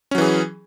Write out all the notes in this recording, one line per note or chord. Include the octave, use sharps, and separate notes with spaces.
E3 F#3 C#4 G#4